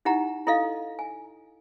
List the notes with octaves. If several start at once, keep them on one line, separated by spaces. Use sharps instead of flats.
D#4 E4 G4 F#5 A#5
E4 A4 D#5 F5
G#5